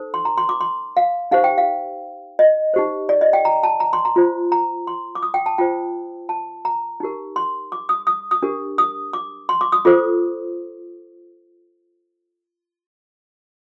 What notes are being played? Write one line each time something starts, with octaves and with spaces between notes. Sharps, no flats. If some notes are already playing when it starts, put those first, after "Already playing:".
Already playing: D#4 A4 C5
C6
A#5
C6
D6
C6
F5
D#4 G4 C5 F5
G5
F5
D#5
D#4 G4 C5
D5
D#5
G5
A#5
A5
A#5
C6
A#5
F4 C5
A#5
C6
D6
D#6
G5
A5
F4 C5 G5
A5
A#5
D#4 G4 A#4
C6
D6
D#6
D#6
D#6
D4 G4 A#4
D#6
D6
C6
D6
D#6
F4 A4 C5 D6